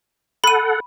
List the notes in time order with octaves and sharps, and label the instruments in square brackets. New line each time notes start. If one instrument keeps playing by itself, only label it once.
[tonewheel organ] A4 F#5 [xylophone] B5 D#7